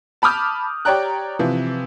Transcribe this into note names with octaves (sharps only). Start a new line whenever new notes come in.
A5 B5 D6 D#6 F6 G6
G4 C#5 D5 G5 A#5 F#6
C3 E3 F3